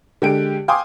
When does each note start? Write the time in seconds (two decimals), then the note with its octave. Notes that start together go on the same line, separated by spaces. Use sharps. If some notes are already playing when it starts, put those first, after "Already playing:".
0.22 D3 G#3 G4 D7
0.68 F5 G5 G#5 C6 D6 D#6